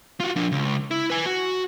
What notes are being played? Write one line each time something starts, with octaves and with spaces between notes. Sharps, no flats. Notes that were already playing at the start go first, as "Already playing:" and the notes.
F4 F#4
F3 D4
C#2
E4
B4 G#5
F#4